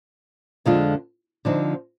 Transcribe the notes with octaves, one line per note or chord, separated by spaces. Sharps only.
F2 D3 G#3 D4 F4
D3 F3 C4 D#4